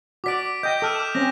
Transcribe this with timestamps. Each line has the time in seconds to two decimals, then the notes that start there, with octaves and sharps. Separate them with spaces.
0.24 F#4 D5 D6 B6 D7
0.63 D#5 G5 G6
0.82 A4 D#6 F6 D#7
0.95 D6 F6 E7
1.15 C4 C#4 A#6